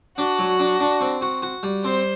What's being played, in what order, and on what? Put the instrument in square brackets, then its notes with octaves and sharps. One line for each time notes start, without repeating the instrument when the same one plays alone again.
[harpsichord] D4 [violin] F#4
[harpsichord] F#3
D4
D4
C4
F#4
F#4
G3
[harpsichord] C4 [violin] C5